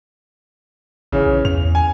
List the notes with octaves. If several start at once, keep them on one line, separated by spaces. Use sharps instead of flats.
G1 C#3 E3 C#4
A#1
E2 F7
G#5